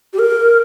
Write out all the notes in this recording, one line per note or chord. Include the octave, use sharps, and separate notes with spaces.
G4
A#4